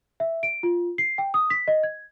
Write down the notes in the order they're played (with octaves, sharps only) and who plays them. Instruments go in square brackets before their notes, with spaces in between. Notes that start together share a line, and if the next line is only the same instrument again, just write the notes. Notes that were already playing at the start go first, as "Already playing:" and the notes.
[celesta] E5
D7
F4
C7
G5
D#6
B6
D#5
G#6